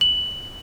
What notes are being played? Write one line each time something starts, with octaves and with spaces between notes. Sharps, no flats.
F#7